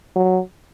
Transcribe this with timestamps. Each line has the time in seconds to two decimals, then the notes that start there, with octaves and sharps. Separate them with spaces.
0.16 F#3